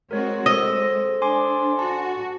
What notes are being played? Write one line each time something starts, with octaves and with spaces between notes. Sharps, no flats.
G#3 C4 F#4 A#4 C#5
G#3 A4 C5 D#5 E6
D4 G#5 C6 D6
F#4 A5